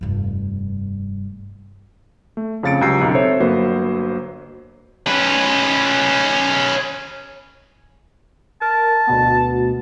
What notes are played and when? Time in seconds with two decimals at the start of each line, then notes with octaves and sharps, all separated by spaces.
0.01 F1 G2
2.37 A3
2.63 F2 C#3 F5 A6 C#7 D7
2.81 C#2 F#3 G4 A#5 E6 C7
3.01 B1 F#2 C#3
3.15 C4 A4 C5 C#5 E5
3.40 G1 F#3 A#3 B4 C5
5.07 C#4 B4
8.62 A#4 A5
9.07 D2 B2 B3